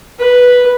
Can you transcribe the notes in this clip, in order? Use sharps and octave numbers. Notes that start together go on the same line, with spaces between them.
B4